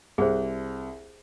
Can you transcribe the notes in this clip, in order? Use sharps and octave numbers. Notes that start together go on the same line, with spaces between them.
C2 G#4 C5